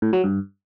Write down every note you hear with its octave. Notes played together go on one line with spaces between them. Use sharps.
A2
F#3
G2